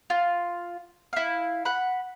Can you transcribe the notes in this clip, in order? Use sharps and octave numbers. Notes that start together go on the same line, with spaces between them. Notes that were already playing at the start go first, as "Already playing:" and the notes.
F4
E4 F5
F#5 B5